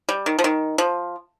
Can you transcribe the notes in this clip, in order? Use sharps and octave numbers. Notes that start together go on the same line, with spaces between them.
G3
D#3
F3
D#3
F3